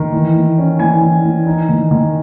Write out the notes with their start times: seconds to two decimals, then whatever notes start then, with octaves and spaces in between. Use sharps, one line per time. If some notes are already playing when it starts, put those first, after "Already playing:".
Already playing: D#3
0.12 E3
0.35 E3
0.58 C#4
0.79 E3 G#5
1.01 E3
1.25 E3
1.47 D#4
1.69 D#3
1.91 D#3